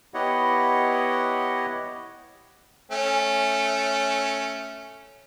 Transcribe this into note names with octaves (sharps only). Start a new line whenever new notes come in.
B3 E4 G4 C#5 D#5 F#5
A3 C#4